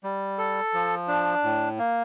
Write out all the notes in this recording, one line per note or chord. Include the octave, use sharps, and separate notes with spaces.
G3
A4
F3
D4
A2
A#3